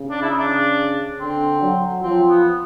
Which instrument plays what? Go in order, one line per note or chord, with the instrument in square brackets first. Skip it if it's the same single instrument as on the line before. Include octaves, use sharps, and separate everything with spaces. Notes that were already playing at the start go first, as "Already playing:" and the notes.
Already playing: [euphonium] C#3
[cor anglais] D4
E4
D#4
D4
[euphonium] D3 [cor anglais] C4
[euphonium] F#3
[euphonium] F3 [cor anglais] C4
[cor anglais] B3